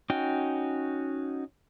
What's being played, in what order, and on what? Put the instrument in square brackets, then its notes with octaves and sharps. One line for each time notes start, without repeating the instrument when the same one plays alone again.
[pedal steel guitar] C#4 D#4 F#4 G5